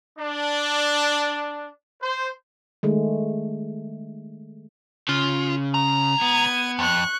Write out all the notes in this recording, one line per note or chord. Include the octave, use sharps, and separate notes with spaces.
D4
C5
D#3 G#3 A3
C#3 F4
C#2 A#5
B3 G#6 D#7
F2 C#6 F#6